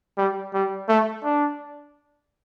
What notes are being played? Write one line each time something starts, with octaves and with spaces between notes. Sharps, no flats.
G3
G3
A3
D4